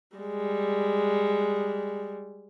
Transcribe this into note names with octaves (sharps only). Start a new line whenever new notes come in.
G3 G#3